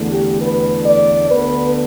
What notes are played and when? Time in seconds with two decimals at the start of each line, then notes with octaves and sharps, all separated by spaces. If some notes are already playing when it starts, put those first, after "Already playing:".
Already playing: E2 D3 A3
0.10 G4
0.40 B4
0.85 D5
1.30 D2 D3 B3 B4